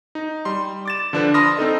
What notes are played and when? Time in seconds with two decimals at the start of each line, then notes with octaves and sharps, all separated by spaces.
0.15 D#4
0.45 G3 C6
0.85 D6 A6 E7
1.13 D3 F3 D4 B4
1.34 A5 B5 C6 D#6 F6 A#6
1.57 C4 D#4 A4 D#5